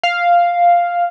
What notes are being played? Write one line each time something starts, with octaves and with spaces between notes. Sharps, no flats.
F5